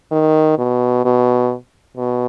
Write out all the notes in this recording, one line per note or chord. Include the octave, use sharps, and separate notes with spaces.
D#3
B2
B2
B2